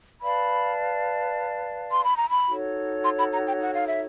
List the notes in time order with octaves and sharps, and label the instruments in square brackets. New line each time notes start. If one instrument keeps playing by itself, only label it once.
[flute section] B4 D5 F5 A5 [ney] B5
[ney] C6
B5
A#5
B5
[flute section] D#4 F#4 A4 C#5
[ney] C6
B5
A#5
G5
F#5
F5
E5